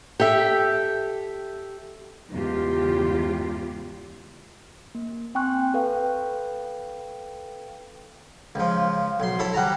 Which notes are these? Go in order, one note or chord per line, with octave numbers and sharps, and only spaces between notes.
G4 A4 E5 G5
E2 G#2 C#3 F4 G4
A#3
C4 G5 G#5 C6 C#6 F#6
A4 B4 F5 G5
C#2 F3
B1 C6
E4 A4 C#5
G3 F#5 A5 A#5